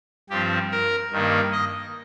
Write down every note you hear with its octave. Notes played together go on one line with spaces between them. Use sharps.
G2 F3 C4 G4
A#4
G2 D#3 A#3
D#5